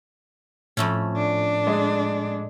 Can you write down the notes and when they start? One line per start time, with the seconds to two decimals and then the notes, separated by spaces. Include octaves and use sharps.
0.77 F2 A2 A3 C#4
1.17 D4
1.67 G#3